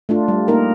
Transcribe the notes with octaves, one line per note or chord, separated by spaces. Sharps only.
A3 D4 F4
G3
A#3 D#4 A#4